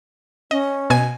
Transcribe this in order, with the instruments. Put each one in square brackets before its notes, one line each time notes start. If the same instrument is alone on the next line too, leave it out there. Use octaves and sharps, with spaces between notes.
[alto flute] C#4 [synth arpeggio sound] D#5
[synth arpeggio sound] B2 G#5 G#6